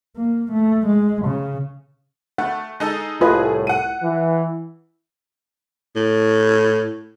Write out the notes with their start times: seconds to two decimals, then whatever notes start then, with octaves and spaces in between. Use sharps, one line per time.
0.16 A#3
0.52 A3
0.87 G#3
1.25 C#3
2.38 A3 F#5
2.80 G#3 D#4 A4
3.21 C2 A2 F4 G#4 B4 D#5
3.67 F#5 D#7
4.03 E3
5.96 A2